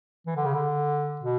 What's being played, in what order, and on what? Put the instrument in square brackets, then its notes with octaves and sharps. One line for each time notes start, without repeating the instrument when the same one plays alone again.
[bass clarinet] E3
D3
C#3
D3
B2